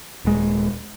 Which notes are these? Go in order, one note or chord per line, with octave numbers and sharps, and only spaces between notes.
D#1 G#3